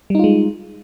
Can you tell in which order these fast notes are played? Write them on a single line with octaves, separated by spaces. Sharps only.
G3 D#4 F4 G#3